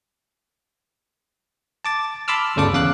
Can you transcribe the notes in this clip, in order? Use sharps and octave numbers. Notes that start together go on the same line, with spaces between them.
A5 D6 A6
A5 B5 C6 D6 E6 F6
G1 D2 C#3 A4 D5 D6
E2 C#3 F5 D6 F#6